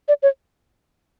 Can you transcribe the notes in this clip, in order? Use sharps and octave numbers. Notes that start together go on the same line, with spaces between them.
D5
C#5